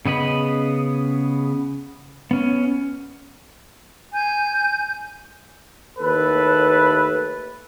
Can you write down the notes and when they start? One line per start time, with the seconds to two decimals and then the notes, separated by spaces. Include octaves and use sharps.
0.06 C#3 B3 D#5 B5
2.31 B3 C#4
4.13 G#5 G6
5.99 D#2 A2 A4 B4